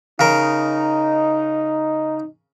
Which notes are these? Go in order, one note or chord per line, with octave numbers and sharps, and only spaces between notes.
C#3 D#4 A#4